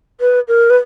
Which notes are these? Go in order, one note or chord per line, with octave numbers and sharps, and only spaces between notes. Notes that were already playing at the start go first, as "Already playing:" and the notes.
B4
A#4
B4